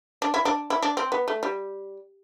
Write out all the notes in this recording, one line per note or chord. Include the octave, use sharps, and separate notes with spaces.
D4
E4
D4
E4
D4
C4
B3
A3
G3